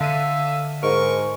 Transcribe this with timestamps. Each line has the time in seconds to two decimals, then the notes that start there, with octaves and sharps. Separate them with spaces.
0.01 D3 E5 F5 D#7
0.83 G#2 A#4 C#6